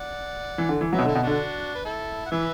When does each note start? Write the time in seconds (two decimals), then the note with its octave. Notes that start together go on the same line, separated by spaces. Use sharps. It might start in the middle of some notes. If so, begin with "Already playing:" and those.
Already playing: D5 F#5
0.58 E3
0.69 D3
0.81 E3
0.92 F#3 B4 E5
0.99 B2
1.04 D3
1.08 E4 A4
1.15 B2
1.23 D3 D4 F#4
1.75 B4
1.85 E4 A4
2.26 F#5
2.31 E3 B4 E5